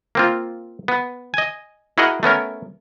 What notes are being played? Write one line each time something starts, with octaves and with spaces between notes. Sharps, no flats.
A#3 C4 F4
B3
D#5 G#5
E4 F#4 G#4 A#4 D#5 F#5
A3 B3 C#4 A#4